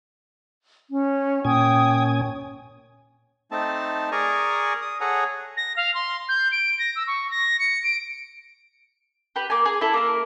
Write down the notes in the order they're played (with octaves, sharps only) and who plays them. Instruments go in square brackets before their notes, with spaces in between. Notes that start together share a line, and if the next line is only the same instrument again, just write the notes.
[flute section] C#4
[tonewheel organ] A#2 C#4 G#5 [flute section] G5 D#6
[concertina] A3 C4 D#4 A5
G#4 A#4 D5 G#5 A#5 C#6
D#6
G#4 A4 C#5 F#5 G#5 A#5
[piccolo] A#6
F5
C6
G6
D7
A#6
E6
C#6
A#6
C#7
D7
[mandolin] G4 B4
A#3 G#5
G#4
E4 A4
A#3 A#4